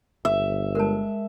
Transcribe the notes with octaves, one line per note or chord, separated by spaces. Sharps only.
G1 E5
G#3 A#4 A5